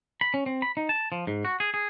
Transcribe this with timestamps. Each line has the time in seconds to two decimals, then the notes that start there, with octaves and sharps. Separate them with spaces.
0.21 B5
0.34 C#4
0.46 C4
0.62 B5
0.77 D#4
0.89 A5
1.12 F3
1.27 G#2
1.45 F#4
1.60 G#4
1.74 G#4